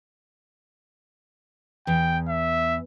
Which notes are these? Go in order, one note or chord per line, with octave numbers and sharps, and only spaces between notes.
E2 G5
E5